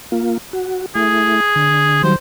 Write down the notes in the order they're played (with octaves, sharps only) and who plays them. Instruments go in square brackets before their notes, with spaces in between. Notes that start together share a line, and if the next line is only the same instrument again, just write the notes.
[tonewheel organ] A#3 F4
F#4
[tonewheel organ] A3 E4 [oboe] G#4
[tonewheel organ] D3
[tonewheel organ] D#3 F#3 G3 [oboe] C5